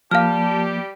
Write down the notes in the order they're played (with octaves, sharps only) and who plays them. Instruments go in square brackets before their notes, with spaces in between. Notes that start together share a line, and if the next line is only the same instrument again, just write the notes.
[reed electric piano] F3 A#3 [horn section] G3 G4 [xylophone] F5 F6 [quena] A5